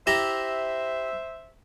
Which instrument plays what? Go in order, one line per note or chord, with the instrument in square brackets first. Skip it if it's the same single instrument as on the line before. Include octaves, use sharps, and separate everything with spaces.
[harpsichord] E4 G4 A#5 [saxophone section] C5 E5